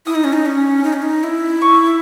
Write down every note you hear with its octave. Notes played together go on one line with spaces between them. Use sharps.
E4 D#6
D#4
C#4
D#4
C#4
D#4
C#4
D#4
E4
C#6